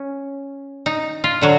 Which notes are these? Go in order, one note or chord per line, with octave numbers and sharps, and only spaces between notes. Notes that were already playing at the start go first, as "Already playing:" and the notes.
Already playing: C#4
D#4
F4
D3 F#3 F#4